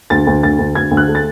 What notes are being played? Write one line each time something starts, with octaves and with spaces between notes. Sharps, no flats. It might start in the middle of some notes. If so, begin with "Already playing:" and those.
D2 A6
D2
D2 A6
D2
D2 G#6
D2
F#6
A3
A6